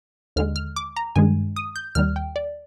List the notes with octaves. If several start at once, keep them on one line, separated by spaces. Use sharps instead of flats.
D#2 D3 G#3 F6
F6
D6
A#5
G2 D#3 G#3 G#5
D#6
G6
D#2 D#3 G3 F6
G5
D5